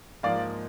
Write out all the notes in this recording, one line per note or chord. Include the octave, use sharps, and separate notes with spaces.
G#2 F3 A#3 D#4 D5 F5